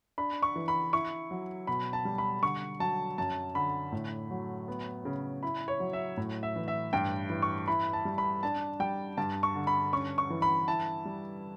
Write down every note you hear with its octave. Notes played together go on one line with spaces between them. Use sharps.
D4 B5
C#6
E3
B5
E4 C#6
F#3
B2 B5
A5
G3
B5
D3 C#6
F#3 A5
F#2 A5
D3 B5
A2
F#3
B3
C#3
E4 B5
C#5
F#3
E5
A2
E5
E3
E5
G2 G5
E3
C#6
E4 B5
A5
G3
B5
D4 A5
G3 G5
G2 A5
C#6
D3
B5
C#4 C#6
C#6
E3
B5
E4 A5
G3